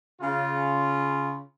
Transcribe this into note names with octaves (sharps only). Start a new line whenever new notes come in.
C#3 F4